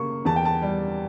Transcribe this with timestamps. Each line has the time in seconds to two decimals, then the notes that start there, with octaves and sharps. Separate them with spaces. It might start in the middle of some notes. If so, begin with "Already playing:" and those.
Already playing: C#3 A#3 C#6
0.25 E2 A5
0.36 G5
0.45 A5
0.62 G3